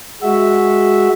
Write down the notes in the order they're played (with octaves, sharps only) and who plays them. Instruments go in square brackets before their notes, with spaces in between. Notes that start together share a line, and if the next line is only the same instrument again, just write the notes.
[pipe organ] G#3 F#4 E5